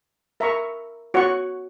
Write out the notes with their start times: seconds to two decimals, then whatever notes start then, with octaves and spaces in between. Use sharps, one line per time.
0.40 A#4 E5 A#5 C#6
1.14 F#4 C#5 F#5 C#6